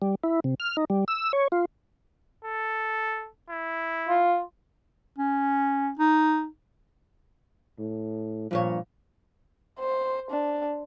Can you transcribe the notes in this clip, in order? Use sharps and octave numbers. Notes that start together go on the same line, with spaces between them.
G3
E4
C3
F6
D#4
G3
E6
C#5
F4
A4
E4
F4
C#4
D#4
A2
G2 A#2 F3 C#5
C5
D4